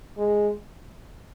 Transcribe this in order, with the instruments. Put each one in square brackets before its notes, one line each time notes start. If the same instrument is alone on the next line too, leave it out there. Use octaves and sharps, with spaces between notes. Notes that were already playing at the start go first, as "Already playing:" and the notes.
[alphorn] G#3